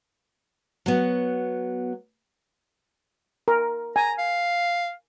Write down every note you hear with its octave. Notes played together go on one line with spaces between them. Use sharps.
F#3 B3
A#4
G#5 A#5
F5